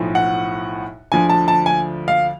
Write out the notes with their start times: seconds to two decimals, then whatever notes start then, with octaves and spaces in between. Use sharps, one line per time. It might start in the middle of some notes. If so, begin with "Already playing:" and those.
Already playing: B1 A2 F3
0.15 F#5
1.12 D2 D3 F3 G#5
1.29 A5
1.48 A5
1.66 G#5
2.08 F5